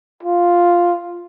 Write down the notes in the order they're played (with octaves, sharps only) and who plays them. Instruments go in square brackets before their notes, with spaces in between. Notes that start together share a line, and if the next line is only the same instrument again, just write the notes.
[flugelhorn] F4